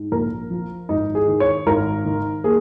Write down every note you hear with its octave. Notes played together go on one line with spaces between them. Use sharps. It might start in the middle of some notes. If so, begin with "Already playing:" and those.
Already playing: G#2
A#1 A#4
F3
G#1 D#4
G#4
D#3
C#5
G#1 A#4
D#3
A#3 G#4